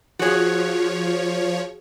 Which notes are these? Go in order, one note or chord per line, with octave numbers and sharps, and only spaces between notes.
F3 F#4 G#4 C#5